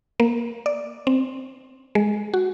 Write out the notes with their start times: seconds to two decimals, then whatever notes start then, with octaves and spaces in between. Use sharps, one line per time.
0.20 A#3
0.66 D5
1.07 C4
1.95 G#3
2.34 F#4